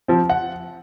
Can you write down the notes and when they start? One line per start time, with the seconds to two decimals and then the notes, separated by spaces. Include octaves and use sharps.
0.08 F3 C4
0.30 F#5